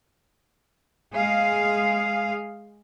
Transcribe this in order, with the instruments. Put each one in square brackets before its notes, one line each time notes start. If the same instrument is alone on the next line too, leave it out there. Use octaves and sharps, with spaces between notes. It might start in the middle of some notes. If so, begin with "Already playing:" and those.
[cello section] G#3 G#4 F5